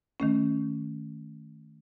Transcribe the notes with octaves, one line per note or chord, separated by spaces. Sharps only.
D#3 A3 C#4